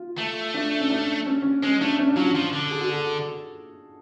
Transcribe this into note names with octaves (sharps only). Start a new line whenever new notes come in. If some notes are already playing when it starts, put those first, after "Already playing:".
Already playing: F4
A3
D4
C#4
D4
C#4
C#4
G#3 C#4
A3 D4
C#4
D4
F#3 F4
F#4
F3
D3
G#4
F#4
A4